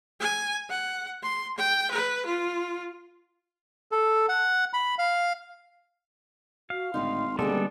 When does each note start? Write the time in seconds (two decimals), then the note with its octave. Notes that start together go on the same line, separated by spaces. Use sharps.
0.20 G#5
0.69 F#5
1.22 C6
1.58 G5
1.91 B4
2.25 F4
3.92 A4
4.29 F#5
4.73 B5
4.98 F5
6.70 F#4 F5
6.94 G#1 A2 D3 D#4 C6
7.39 D#1 D3 G3 G#3 B3 G#4 A4 G5